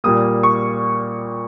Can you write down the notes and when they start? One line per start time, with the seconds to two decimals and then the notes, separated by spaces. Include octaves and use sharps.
0.04 A#2 G3 A#3 D#6
0.43 C#6